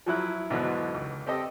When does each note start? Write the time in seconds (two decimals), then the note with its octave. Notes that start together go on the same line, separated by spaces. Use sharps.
0.06 F3 F#3 E4 F#6
0.50 G#2 B2 D3 E3 F#3
0.94 C#2
1.27 C4 G4 A4 D#5